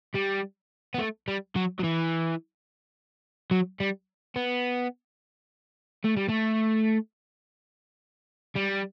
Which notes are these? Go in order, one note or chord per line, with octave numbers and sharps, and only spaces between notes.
G3
B3
A3
G3
F#3
F#3
E3
F#3
G3
B3
A3
G3
A3
G3